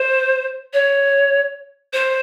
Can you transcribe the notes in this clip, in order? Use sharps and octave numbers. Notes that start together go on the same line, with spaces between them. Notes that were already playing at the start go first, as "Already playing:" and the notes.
Already playing: C5
C#5
C5